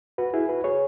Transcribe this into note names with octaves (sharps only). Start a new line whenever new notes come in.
F#4 B4
E4 G#4
F#4 B4
G#4 C#5